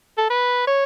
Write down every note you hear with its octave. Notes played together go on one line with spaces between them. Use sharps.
A4
B4
C#5